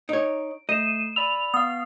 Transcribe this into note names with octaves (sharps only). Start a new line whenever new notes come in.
D#4 C#5 D7
A3 D#5 C7 D#7 E7
D5 B5 E6 F7
B3 F5 D#6